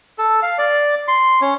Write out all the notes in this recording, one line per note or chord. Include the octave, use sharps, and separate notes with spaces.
A4
F5
D5
C6
C#4